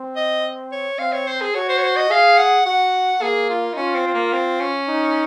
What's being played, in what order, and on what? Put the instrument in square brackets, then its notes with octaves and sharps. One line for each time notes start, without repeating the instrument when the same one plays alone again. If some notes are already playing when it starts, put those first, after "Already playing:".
Already playing: [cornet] C4
[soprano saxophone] D#5
C#5
[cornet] C4 [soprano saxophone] F5
[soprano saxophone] C#5
C5
G#4
[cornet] F#4 [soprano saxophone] C#5
[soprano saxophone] C5
C#5
C5
D#5
[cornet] G#4 [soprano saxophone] F5
[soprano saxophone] F#5
[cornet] F#4 [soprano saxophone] F#5
[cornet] A#3 [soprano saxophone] G#4
[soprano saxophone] F4
D#4
[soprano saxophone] C#4 [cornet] F4
[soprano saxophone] C4
C4
A#3
C4
C#4
[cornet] D#4